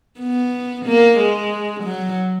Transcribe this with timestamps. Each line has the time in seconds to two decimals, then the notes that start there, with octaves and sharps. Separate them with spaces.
0.20 B3
0.85 A#3
1.18 G#3
1.83 F#3